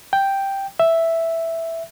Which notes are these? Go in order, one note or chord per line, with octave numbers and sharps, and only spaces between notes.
G5
E5